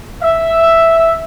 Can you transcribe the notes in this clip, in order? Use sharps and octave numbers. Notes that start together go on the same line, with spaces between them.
E5